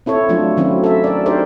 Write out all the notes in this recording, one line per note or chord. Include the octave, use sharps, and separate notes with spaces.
C4 E4 A4 C#5
F3 F#3 A3 D4 F4
D#3 F#3 C4 C#4 E4
A4 E5
A#4 D5
D4 D#4 G4 A#4 C5 D5